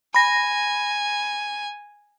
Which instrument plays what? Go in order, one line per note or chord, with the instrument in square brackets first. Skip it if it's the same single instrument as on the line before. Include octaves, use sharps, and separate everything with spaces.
[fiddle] G#5 [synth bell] B5 A#6